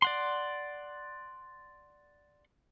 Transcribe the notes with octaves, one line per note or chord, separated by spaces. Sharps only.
D5 F#5 C6